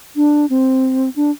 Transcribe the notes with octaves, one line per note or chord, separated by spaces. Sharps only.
D4
C4
D4